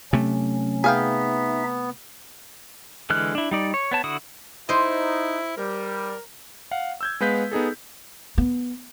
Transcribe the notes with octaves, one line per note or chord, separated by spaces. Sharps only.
C3 F#3 A3 C#4
B3 D#4 G#4 E5 F5 G5
D3 E3 G#3 F6 F#6
D4 E4
G3 D#4 D5
C#5
B3 C#5 A5
D3 E4 F#4 D#6
D#4 E4 C5 D#5
G3 A#4
F5 F#5
E6 G6 G#6
G#3 B3 B4 F5 G6 B6
B3 D#4 G#4 A4
B3